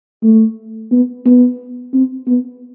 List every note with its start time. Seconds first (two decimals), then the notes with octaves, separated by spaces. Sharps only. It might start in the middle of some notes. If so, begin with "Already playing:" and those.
0.23 A3
0.91 B3
1.26 B3
1.94 C4
2.27 B3